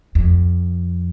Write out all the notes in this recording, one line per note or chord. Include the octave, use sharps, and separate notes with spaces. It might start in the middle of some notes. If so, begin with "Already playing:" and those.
F2